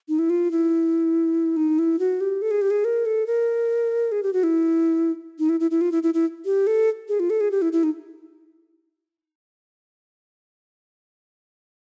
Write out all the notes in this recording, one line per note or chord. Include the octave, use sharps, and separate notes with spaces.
D#4
E4
F4
E4
D#4
E4
F#4
G4
A4
G#4
G4
G#4
A#4
A4
A#4
G#4
G4
F#4
E4
D#4
E4
E4
E4
F4
E4
E4
E4
G4
A4
G#4
F4
A4
G#4
G4
E4
E4
D#4